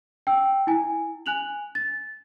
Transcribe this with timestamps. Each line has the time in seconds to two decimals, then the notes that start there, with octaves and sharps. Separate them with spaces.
0.27 G5 E6
0.67 E4 G#5
1.26 G#5 F#6 F7 F#7
1.75 A6